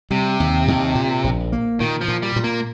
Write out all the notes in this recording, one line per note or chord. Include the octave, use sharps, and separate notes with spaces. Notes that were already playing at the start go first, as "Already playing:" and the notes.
C3 G3
D#2
D#2
A#2
A#1
A#3
A#2 D#3
F3
A#2
G3
A#2
A#3